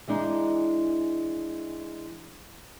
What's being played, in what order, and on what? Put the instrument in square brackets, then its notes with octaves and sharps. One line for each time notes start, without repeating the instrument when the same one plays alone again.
[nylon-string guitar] E3 G#3 D4 D#4